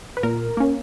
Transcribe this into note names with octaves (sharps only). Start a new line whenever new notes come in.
B4
A#2 A#4
A#3 C#4